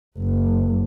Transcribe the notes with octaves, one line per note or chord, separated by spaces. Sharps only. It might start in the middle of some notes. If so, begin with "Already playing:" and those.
F#1